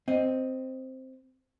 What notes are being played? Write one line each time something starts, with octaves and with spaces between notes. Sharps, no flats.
C4 D#5